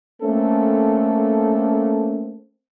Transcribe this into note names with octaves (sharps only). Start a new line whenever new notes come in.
A3 A#3 C4 C#4 A4